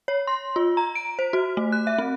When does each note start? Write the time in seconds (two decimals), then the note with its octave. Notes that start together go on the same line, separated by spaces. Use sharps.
0.08 C#5
0.27 C6
0.56 F4
0.77 A#5
0.95 D7
1.19 C5
1.33 F#4
1.57 A3
1.72 F#6
1.87 E5
1.98 C4